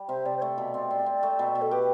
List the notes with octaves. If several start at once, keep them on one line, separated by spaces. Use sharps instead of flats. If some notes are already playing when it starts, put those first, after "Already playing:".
Already playing: G3
C3 C5
C3 D5
C5
A3 D5
B2
C4
C4
C4
A3
B2
B2
A4
G4 B4